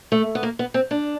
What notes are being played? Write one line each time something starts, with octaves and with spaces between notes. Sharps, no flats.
A3
B3
A#3
B3
C4
D4